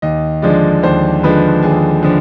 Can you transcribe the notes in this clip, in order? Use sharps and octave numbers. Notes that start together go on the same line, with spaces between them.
D#2 D#5
D3 F3 G#3 D5
D#2 C5
D3 F3 G#3 B4
D#2 G#4
D3 F3